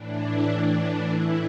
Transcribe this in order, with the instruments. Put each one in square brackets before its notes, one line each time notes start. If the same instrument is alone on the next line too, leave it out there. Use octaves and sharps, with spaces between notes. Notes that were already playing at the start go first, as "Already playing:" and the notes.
Already playing: [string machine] A2 E3 D4
E4
A2 E3 D4
D4
A2 E3 E4